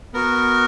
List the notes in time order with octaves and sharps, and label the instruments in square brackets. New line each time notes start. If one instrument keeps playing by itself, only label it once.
[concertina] B3 F#4 A#4